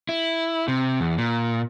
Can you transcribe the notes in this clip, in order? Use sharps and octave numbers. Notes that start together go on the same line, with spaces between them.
E4
C3
E2
A#2